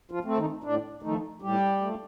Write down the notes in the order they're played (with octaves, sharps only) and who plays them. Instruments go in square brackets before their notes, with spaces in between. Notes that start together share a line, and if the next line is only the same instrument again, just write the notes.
[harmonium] F3 F4
A3 C4
D#3 D#4
A2 D4
D#3 F3 A3 D#4
A2 G3 G4
F3 A3